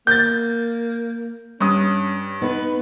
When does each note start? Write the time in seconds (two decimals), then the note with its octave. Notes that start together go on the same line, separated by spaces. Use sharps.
0.07 A#3 G6 A6
1.61 G2 C#4 D#6
2.42 B3 D#4 B4